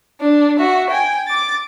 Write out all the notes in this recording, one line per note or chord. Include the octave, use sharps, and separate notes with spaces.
D4
F#4 E5
G5 G#5
D6 A6